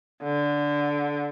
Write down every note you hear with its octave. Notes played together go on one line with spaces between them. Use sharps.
D3